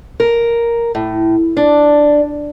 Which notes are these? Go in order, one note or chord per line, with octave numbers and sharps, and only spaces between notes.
A#4
A2
D4